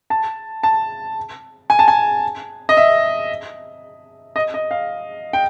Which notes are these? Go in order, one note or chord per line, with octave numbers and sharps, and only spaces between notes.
A5
A5
G#5
A5
G#5
D#5
E5
D#5
D#5
F5
G5